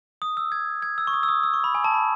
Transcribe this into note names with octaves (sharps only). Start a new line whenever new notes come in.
D#6
E6
G#6
G#6
E6
C#6
D#6
E6
D#6
E6
C#6
B5
G#5
A5
B5